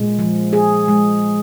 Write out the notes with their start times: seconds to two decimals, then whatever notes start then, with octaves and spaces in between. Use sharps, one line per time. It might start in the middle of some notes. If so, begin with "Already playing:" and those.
Already playing: A#2 G#3
0.19 F3
0.53 G#4
0.88 G#3